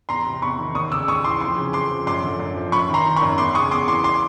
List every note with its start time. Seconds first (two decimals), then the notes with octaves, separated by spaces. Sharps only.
0.09 E2 A#5 C6
0.26 C3
0.42 E2 B5 C#6
0.59 D#3
0.75 D#2 C#6 D#6
0.91 C#3 D6 E6
1.07 D#2 C#6 D#6
1.24 E3 C6 D6
1.40 F2 C6 D6
1.57 C#3
1.73 F2 C6 D6
1.91 F3
2.07 F#2 C6 D6
2.23 D3
2.39 F#2
2.57 F3
2.72 F#2 B5 C#6
2.89 D#3 A#5 C6
3.06 D#3
3.16 B5 C#6
3.22 F#2
3.38 E2 C6 D6
3.55 C#3 C#6 D#6
3.71 E2 C6 D6
3.87 E3 C6 D6
4.04 C6 D6